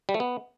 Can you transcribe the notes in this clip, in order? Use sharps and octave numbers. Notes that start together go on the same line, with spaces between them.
G3
A3
B3